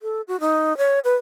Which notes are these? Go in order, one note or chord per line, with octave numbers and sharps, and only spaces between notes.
A4
F#4
D#4
C#5
B4